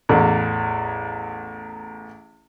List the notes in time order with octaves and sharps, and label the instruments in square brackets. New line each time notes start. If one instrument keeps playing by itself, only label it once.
[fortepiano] A1 E2